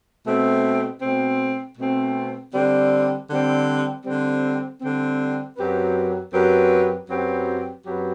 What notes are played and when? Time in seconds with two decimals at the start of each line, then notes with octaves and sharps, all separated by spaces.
0.26 B2 A3 C4
1.01 B2 A3 C4
1.77 B2 A3 C4
2.54 D3 G3 C4
3.30 D3 G3 C4
4.05 D3 G3 C4
4.81 D3 G3 C4
5.57 F#2 F#3 C4 G4 B4
6.33 F#2 F#3 C4 G4 B4
7.09 F#2 F#3 C4 G4 B4
7.85 F#2 F#3 C4 G4 B4